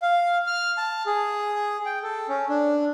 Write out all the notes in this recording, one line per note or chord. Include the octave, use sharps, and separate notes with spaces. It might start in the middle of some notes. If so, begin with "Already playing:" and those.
F5
F6
A5
G#4
G5
A4
C#4
D4